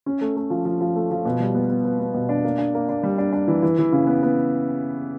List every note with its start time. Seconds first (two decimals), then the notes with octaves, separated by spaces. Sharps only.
0.06 C#4
0.21 A3
0.36 A3
0.50 F3
0.65 F3
0.81 F3
0.96 A3
1.11 F3
1.25 B2
1.40 G3
1.55 B3
1.69 B3
1.85 B3
1.99 B3
2.14 B2
2.29 D4
2.44 A#3
2.58 D4
2.74 A#3
2.89 D4
3.03 G3
3.18 D4
3.33 D4
3.48 E3
3.62 E3
3.78 E3
3.92 C#3
4.07 B3
4.23 B3